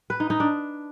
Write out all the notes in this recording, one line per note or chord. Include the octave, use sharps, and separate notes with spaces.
B4
D#4
D#4
D4